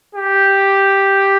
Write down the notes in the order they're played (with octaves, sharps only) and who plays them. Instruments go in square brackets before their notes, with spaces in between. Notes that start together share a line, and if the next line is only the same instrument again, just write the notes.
[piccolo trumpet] G4